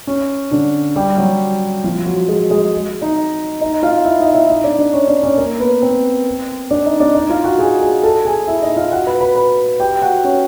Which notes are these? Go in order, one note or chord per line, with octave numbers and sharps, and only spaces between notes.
C#4
D3 D4
G3 G4
F#3 F#4
F3 F4
F#3 F#4
G#3 G#4
G#3 G#4
D#4 D#5
D#4 D#5
F4 F5
E4 E5
D#4 D#5
E4 E5
D#4 D#5
D4 D5
D4 D5
C#4 C#5
D4 D5
C#4 C#5
A#3 A#4
B3 B4
C4 C5
D4 D5
D#4 D#5
D4 D5
D#4 D#5
F4 F5
F#4 F#5
G#4 G#5
G#4 G#5
A4 A5
G#4 G#5
E4 E5
D#4 D#5
F4 F5
F#4 F#5
B4 B5
B4 B5
B4 B5
G4 G5
F#4 F#5
C#4 C#5